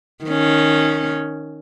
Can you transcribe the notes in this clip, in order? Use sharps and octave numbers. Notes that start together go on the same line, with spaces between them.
D#3 C#4